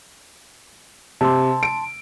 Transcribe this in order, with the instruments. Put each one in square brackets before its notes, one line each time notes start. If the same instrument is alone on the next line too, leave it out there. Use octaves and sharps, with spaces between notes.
[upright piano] C3 [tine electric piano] A5 C6
[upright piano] D7